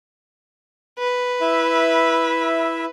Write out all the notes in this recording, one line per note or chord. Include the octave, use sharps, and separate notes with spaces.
B4
E4 E5